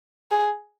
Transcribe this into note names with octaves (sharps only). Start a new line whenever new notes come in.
G#4